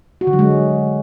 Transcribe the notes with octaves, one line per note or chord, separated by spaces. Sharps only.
F#4
D3
F#3
G#3